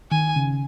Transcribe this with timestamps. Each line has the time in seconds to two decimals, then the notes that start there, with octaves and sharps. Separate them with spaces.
0.11 D#3 G#5
0.36 C#3